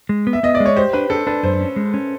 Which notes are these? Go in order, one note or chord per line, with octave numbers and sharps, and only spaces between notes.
G#3
B3
E5
B3 D#5
D5
G#3
C#5
G4 C5
D4 B4
D4 A4
D4 B4
F#2 C5
C#4
G#3
C#4